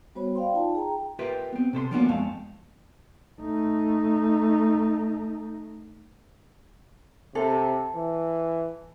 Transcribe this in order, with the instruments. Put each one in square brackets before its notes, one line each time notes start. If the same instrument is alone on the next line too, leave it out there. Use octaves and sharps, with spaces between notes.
[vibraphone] G3 B3 F#4 C5 C#5 B5
D5 F5 G5 C6
D#4 F4 A5
G#4 G5 A#5
[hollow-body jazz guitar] F4 G4 A#4 B4 E5 G5
B3 C4
C3 A4 C5 C6
F3 A#3 B3 C#4 D4 F#4
F2 G#3 A3 F5 A5
[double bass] A3 D#4
[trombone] C3 [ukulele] A4
[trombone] E3